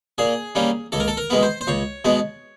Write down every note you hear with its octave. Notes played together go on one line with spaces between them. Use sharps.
A#2 G#4
G3 A#3 C#4
C#2 A4
A#4
A4
A#4
B2 G#3 B3
C5
C5
C#2 C#5
B2 G#3 B3